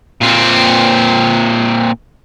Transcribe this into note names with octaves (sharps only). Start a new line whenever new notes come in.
A#2 C4